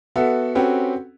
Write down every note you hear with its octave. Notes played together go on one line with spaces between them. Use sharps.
B3 F#4 A4 E5
C4 C#4 F#4 G4 A4 B4